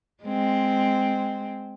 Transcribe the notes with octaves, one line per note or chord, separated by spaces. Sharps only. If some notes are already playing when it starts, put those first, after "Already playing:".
G#3 C4